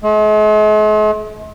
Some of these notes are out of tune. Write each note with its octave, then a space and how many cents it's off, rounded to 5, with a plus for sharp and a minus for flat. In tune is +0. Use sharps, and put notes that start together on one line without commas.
G#3 +45